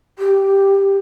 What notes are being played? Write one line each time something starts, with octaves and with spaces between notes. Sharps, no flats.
G4